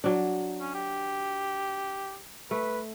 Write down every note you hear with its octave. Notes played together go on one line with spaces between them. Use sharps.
F#3 D4
C#4
G4
A3 B4